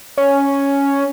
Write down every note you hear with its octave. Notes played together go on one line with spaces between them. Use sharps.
C#4